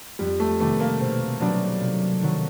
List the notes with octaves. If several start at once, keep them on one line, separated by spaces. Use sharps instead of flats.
F2 G3
A3
C3 D#3 G3 A3 B3
A#3
B2 C4
F#3 B3 D4 D#4 G4
C3
D#3 F#3